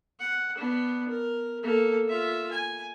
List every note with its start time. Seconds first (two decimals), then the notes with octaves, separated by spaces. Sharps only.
0.20 F#5
0.58 B3 D4
1.08 A#4
1.63 A#3 A4
2.08 F4 E5
2.51 G#5